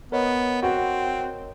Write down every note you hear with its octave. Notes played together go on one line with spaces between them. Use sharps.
B3 A#4 C#5 D#5
C4 F#4